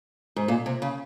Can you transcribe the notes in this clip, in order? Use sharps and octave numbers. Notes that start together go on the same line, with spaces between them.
G#2
A#2
C3
C#3